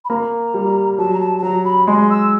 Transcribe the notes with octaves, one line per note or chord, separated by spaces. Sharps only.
B5
A#3 A#5
G3
F#3 A5
A#5
A5
A5
F#3 A#5
B5
G#3 C6
E6